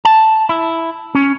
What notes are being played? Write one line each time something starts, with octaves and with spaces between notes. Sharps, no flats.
A5
E4
C#4